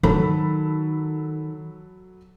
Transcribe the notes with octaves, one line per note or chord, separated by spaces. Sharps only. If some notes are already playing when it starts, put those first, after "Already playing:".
D#3 F#3 A4 B5